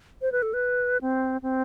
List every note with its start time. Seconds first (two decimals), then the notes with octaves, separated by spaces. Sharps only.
0.22 C5
0.32 B4
0.42 A4
0.54 B4
1.01 C4
1.43 C4